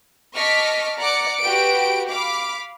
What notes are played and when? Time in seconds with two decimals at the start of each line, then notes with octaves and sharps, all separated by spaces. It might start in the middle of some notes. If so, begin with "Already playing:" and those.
0.35 D#5 A5 C#6 D6 F6 B6
0.98 D5 F#5 A#5 D6 C#7
1.41 F#4 G4 B4 G5 D7
2.12 F5 B5 D6